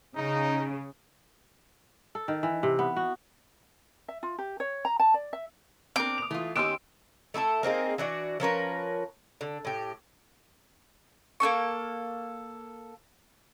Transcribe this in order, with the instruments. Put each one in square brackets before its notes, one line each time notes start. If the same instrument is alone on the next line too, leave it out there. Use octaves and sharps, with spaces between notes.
[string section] C#3 [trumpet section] D#4
[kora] A4
D#3
E3
C3
B3
F#4
[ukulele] E5
F4
G4
C#5
A#5
A5
D5
E5
[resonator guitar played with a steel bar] C4 D4 A#4 [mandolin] D6
[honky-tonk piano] D#6 F7
[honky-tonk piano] E3 [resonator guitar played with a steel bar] A3 F4
[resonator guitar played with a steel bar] D#3 C#4 G4 [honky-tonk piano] C6 E6 E7 [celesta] D7
[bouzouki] A3 E4 G#4 A4
A#3 C4 D#4 G#4
E3 D4 F#4 D5
F3 C#4 A#4 B4
D3
A2 G4
[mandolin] A#3 D#4 A4 C#6